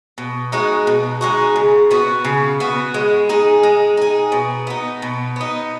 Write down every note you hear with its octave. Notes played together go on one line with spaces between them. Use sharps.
B2
G#3 D#4 F#4
B2
G#3 D#4 F#4
C#3
B3 F#4
C#3
B3 F#4
G#3
D#4 G#4
G#3
D#4 G#4
B2
B3 D#4
B2
B3 D#4